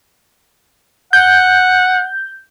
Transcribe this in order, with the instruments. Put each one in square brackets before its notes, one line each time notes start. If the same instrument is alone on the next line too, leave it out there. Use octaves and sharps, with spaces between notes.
[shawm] F#5 [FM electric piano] G6